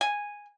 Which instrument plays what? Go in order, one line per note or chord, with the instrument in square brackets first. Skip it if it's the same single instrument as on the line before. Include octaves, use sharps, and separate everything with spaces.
[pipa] G#5